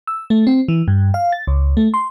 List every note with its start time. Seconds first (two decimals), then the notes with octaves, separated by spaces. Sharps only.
0.07 E6
0.30 A3
0.47 C4
0.68 E3
0.88 G2
1.14 F5
1.32 A6
1.47 C#2
1.77 A3
1.94 C6